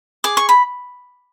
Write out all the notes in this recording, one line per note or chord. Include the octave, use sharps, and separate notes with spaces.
G#4 D6
C#6
B5